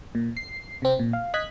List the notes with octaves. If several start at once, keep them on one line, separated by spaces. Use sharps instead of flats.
A#2
C7
C3 C4
A#2
F5
D#5 F#6 G#6 B6